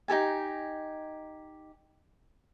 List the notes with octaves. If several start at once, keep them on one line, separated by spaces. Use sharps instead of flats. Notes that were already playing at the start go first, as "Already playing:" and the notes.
D#4 G4 A4 G#5